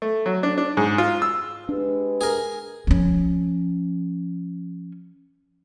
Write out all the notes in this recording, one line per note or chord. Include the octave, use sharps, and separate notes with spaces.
A3
F#3
D4
D4
G#2
F4
E6
G#3 D4 G4 B4
G#4 A#4
F3 C#4